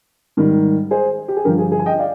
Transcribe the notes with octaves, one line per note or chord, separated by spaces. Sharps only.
G#2 D#3 G3
G#4 C5
G4
G#4
G2 D3 F3 G4 A#4
G#4
G#4
G#5
D#5 G5
D5 F5